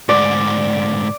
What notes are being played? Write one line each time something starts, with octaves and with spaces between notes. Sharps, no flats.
D2 G#2 D5